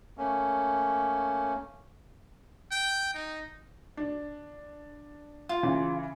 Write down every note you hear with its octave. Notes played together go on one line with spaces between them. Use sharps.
A3 A#3 C#4
G5
D#4
D4
F4
C#3 E3